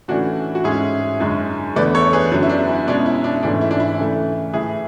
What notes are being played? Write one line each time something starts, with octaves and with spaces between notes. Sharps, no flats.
A2 E3 A3 C#4 D4 F#4
F#4
G#2 G#3 C#4 E4 G#4
F#2 D3 G#3 C#4
E2 D3 A3 B4 D5
A4 C#5
G#4 B4
F#2 D3 F#3 B3
E4
D4
E4
B2 G#3 C#4 D4
E4
D4
G#2 E3 A3 C#4 D4
E4
D4
E4
C#3 E3 A3
A2 E3 A3 E4 G#4